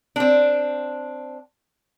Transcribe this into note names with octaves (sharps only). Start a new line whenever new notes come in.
C4 D4